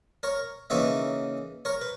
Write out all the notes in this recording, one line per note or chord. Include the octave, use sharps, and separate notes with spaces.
A#4 C#5
C#3 E3 A#3 D#4 C#5 E5
A#4 C#5
B4